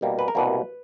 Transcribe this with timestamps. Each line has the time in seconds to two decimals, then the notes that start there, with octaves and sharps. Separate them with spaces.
0.01 C2 B2 G3 A#3
0.19 B4
0.28 A#4
0.35 C2 B2 G3 A#3 B4